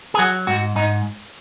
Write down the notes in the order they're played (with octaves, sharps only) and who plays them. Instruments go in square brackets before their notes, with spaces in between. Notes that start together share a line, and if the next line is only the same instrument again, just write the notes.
[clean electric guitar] G#4
F#3 F#4
G#2 F#4
G#2 D#4